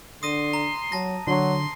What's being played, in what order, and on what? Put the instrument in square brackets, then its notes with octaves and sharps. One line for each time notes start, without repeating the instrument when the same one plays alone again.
[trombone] D3 [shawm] C6 [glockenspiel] D#6 A#6 D#7
[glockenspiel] A#5
[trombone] F#3 [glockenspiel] A5 A#6
[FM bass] D3 [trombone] F#3 [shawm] C6